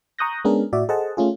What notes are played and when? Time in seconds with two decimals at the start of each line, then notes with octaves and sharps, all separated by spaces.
0.19 A#5 C#6 D#6 F#6 G6 A#6
0.45 G#3 B3 C#4 D4 G#4 A#4
0.73 A2 F#4 D5 E5
0.89 G#4 A4 C5 D#5 F#5 A5
1.17 A3 C#4 F4 G#4